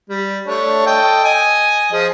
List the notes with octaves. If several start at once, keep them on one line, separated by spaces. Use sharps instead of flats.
G3
A3 D4 C#5
A4 D#5 G5
D#5 G#5
F3 G#4